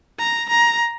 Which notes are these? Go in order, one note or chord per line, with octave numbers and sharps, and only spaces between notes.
A#5
A#5